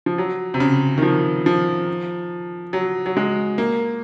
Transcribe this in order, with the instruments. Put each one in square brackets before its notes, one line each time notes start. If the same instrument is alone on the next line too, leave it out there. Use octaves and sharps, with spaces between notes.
[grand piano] F3
F#3
C3
C#3
D#3
F3
F3
F#3
F#3
G#3
A#3